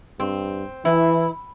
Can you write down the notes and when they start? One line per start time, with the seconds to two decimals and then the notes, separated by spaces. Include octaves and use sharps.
0.20 G2 C4
0.85 E3 E4